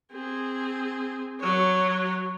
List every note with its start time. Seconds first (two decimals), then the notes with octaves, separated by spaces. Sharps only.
0.12 C4 G#4
1.41 F#3 C#5